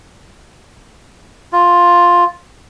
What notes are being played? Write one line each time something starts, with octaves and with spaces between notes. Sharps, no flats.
F4